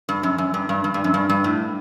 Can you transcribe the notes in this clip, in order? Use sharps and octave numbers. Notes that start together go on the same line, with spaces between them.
G2
F#2
F#2
G2
G2
G2
G2
F#2
G2
G2
A2